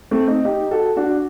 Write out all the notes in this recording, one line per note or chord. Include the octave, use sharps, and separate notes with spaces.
A3 C4
C4 D#4
D#4 G4
F#4 A4
D4 F#4